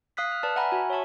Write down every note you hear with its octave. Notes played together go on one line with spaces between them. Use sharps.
F5 D#6 F#6 B6
F6
B4 D5 A5 F6
E5 F#5 G#5 A#5 B5 F6
F#4 G#5
C#5 E5 A5 C#6